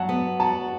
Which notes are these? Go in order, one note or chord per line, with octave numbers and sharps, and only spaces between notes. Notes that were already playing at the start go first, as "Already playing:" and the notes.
Already playing: F#3 F#5 A5
B3
F#4 A5